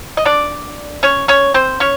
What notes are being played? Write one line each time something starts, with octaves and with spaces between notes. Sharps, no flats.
D#5
D4 D5
C#4 C#5
C#4 C#5
C4 C5
C#4 C#5